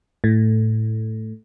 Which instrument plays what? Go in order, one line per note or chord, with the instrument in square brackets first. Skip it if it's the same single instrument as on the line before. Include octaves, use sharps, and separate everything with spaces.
[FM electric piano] A2